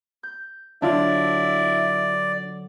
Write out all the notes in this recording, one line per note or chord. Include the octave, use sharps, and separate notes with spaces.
G6
D3 F#3 D4 E4 F4 D5